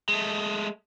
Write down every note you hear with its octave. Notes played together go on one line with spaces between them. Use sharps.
G#3 A3